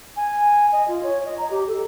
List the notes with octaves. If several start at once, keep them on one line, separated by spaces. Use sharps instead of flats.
G#5
D#5
F4
C#5
D#5
A#5
G4
A4